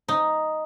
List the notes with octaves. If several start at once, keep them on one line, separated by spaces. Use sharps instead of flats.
D#4